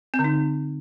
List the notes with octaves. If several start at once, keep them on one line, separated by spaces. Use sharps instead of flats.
C4
D3
D#4